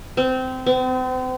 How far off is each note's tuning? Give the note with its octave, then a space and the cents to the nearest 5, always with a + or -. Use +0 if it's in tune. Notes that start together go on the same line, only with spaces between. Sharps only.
C4 -20
C4 -40